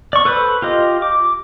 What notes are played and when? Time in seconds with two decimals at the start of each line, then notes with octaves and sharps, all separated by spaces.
0.13 D5 C#6
0.25 A4 B4 C5 B5
0.62 F4 G4 D#5
1.02 D6